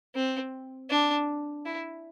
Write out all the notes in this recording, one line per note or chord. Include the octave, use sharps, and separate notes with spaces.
C4
D4
E4